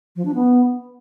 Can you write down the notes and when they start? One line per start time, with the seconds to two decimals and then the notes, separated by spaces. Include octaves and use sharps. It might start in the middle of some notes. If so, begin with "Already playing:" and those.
0.16 F3
0.25 D4
0.35 B3